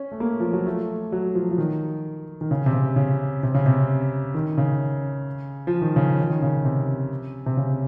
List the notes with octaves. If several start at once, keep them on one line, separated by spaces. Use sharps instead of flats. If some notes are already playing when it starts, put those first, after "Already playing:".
Already playing: C#4
A3
A#3
F3
F#3
A3
F#3
F3
F3
D#3
D#3
C#3
C3
C#3
C#3
C3
C#3
C3
D#3
C#3
F3
D#3
C#3
D#3
D#3
C#3
C3
C3
C#3